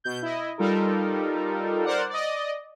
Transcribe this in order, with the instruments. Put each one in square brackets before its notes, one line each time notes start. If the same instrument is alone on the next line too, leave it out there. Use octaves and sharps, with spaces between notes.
[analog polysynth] B2 G6
E4 D#5
G3 D#4 F4 A4 A#4
A#4 C5 D5 F#5
D5 D#5